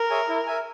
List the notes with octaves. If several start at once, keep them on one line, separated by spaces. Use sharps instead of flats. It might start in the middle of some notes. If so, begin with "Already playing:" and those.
Already playing: A#4
G#4 C#5 E5 G#5
E4
A#4 E5 G#5